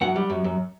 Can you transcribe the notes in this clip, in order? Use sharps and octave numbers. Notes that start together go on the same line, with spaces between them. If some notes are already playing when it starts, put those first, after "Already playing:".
F#2 F#5
G3
F#2
F#2